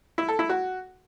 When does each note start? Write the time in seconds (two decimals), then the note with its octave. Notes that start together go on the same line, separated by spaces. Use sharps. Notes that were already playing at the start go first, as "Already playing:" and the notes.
0.18 E4
0.28 A4
0.39 E4
0.49 F#4